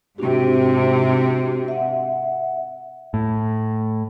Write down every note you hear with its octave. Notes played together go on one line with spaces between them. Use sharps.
G#2 C3 D4 F#4 G4
E5 F#5
A2